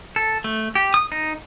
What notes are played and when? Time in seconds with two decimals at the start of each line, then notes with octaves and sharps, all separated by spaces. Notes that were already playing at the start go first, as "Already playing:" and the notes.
0.16 A4
0.44 A3
0.75 G4
0.94 D#6
1.12 D#4